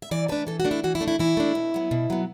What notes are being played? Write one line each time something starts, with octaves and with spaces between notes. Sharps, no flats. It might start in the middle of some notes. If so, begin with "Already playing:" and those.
E5
E3 D5
A3 D4 B4
E3 A4
F#4
A3 D4
E4
E3 F#4
E4
A3 D4
E4
E3 E4
A3 D4
B2
F#3 B3
B2
F#3 B3